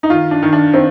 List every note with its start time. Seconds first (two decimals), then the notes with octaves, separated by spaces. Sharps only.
0.03 D#4
0.10 D#3 F4
0.31 D4
0.42 D#3
0.53 D4
0.74 D#3 C4